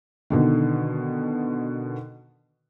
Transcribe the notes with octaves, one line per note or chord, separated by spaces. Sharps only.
B2 D3 D#3